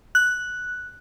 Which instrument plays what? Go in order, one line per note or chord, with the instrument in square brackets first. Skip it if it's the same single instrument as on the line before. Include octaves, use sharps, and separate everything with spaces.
[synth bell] F#6